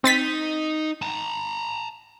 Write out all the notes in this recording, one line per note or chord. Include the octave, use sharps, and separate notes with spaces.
C4 D#4 A6 B6
A5 A#5